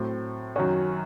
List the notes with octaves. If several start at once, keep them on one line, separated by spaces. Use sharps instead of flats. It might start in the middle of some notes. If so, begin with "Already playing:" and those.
Already playing: A2 F#3 C4
F#2 D#3 F#3 C#4 F#4